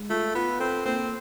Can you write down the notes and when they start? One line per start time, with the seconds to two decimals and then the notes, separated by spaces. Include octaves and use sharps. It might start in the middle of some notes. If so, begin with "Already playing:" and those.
Already playing: G#3
0.09 A3 F4
0.34 B3 F4
0.59 C4 A4
0.85 A#3 C4